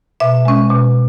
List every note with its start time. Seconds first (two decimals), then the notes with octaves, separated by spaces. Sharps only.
0.20 B2 E5
0.45 G#3 C#4
0.70 B2